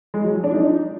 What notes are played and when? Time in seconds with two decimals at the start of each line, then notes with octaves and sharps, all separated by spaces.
0.14 G#3
0.24 F#3
0.34 F3
0.44 D4
0.54 D#4